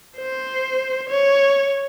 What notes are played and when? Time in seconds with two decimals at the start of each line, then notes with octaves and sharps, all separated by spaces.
0.18 C5
1.10 C#5